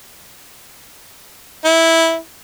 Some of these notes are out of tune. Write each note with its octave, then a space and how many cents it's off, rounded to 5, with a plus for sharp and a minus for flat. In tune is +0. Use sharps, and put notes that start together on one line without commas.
E4 -10